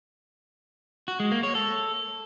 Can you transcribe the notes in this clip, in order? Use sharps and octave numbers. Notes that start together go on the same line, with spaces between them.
F#4
G#3
A#3
C#5
A4